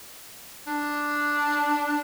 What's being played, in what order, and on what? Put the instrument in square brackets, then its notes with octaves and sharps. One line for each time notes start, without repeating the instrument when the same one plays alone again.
[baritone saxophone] D4